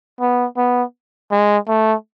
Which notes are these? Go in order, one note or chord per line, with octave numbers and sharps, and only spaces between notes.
B3
B3
G#3
A3